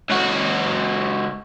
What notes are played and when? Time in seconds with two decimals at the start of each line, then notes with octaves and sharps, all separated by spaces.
0.10 C#2 F#4